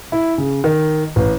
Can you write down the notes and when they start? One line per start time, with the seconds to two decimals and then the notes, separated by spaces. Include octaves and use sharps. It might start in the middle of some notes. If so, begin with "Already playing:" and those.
0.12 E4
0.38 C#3
0.64 D#3
1.16 A1